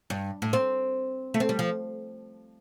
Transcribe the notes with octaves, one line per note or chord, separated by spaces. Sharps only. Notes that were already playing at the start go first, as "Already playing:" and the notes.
G2
A2
C4
A3
C4
G3
F3